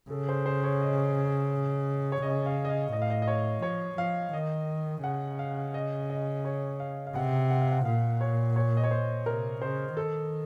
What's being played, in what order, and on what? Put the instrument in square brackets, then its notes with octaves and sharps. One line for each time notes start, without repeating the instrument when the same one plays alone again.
[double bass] C#3 [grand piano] A4
[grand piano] C5
C5
C#5
D#5
C#5
[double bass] C#3 [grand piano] D#5
[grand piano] F5
D#5
F5
[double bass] A2 [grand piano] D#5
[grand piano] F5
D#5
D#5
C#5
[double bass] F3 [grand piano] C#5
[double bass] F3 [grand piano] F5
[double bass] D#3 [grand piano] D#5
[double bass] C#3 [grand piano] F#5
[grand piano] F5
D#5
D#5
C#5
F5
F5
[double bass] C3 [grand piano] F#5
[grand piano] F#5
F5
F#5
[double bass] A#2 [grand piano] F5
[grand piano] C#5
C#5
D#5
C#5
C5
[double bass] C3 [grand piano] A#4
[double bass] C#3 [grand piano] C5
[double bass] D#3 [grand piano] A4